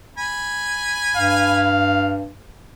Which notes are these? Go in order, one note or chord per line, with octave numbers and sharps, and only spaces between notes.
G#5 B5
G2 F5